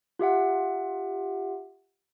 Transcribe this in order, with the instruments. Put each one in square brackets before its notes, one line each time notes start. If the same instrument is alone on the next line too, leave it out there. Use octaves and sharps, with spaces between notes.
[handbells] F4 G4 E5 F#5